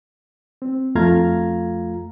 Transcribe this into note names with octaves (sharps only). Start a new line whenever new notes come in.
C4
F2 A3 F4 F5 A#5 G#6